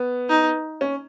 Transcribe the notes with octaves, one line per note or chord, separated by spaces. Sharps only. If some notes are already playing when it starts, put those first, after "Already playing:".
Already playing: B3
D#4
C#4